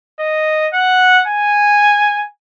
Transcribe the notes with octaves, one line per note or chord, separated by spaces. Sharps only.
D#5
F#5
G#5